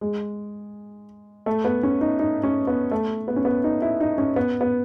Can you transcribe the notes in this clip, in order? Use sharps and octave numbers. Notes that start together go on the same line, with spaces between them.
G#3
A3
B3
C#4
D#4
D#4
C#4
B3
A3
B3
C#4
B3
D#4
E4
D#4
C#4
B3
B3